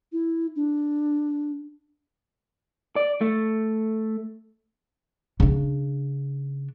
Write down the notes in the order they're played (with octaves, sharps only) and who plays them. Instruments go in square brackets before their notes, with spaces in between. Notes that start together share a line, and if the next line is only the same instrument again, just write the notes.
[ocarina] E4
D4
[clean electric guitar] D5
A3
[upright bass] C#3 D4